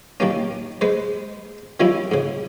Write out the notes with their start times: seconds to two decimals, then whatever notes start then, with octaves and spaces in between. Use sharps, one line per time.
0.20 D#3 G3 A#3 C#4
0.81 G#3 B4 C5
1.80 D#3 F3 G3 C#4 E4
2.12 G#2 C#3